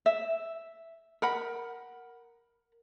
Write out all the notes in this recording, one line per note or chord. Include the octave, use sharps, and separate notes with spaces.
E5
A#4 F#5 B5